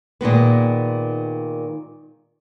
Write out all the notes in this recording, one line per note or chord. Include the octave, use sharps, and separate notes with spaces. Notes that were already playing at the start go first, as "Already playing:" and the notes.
A#2 D#3 G#3 B3